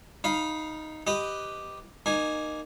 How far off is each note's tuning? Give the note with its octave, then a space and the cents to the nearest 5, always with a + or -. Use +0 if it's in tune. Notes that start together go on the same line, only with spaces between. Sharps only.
D#4 +0 F5 +0 B5 -25
G4 +0 B4 +5 D#5 +0
A#3 +0 D#4 -20 G#5 +0